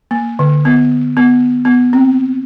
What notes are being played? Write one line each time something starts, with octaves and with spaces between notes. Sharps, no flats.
A#3
D3
B3
B3
B3
C4